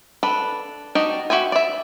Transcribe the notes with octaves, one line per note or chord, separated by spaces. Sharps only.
D4 A4 B4
D4 D#4 F#4 G4
F#4 G4 E5 G#5
D5 E5